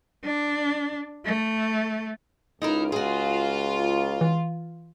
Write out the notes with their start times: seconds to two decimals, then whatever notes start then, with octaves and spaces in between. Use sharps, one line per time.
0.24 D4
1.25 A3
2.62 C#2 D#4 E4 A#4
2.92 F4 F#4 G#4
4.21 E3